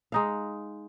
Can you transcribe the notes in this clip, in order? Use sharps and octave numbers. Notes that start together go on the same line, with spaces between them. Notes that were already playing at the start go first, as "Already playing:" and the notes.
G#3 D#4 F5